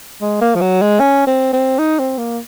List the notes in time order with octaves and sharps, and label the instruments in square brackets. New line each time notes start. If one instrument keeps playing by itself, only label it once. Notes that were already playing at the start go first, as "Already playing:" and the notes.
[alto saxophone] G#3
A#3
F3
F#3
G#3
C#4
C4
C4
D#4
C4
A#3